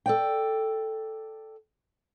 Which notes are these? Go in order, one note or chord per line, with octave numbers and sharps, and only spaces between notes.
A4 D5 G5